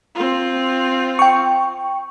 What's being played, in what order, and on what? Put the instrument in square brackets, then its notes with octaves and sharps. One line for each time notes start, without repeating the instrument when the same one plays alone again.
[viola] C4 F4
[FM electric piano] G5 C#6